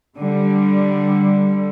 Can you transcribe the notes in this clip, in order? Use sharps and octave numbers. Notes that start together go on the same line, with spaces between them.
D3 G3